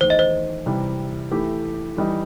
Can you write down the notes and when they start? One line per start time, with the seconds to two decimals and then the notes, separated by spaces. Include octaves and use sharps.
0.01 E2 D#3 A3 C5
0.10 D#5
0.19 C5
0.66 C3 E3 G3
1.31 E3 A3 E4 G4
1.97 E3 G3 D#4